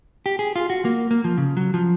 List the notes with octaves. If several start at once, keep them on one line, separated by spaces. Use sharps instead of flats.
G4
G#4
F4
F#4
A#3
A#3
F3
C#3
F#3
F3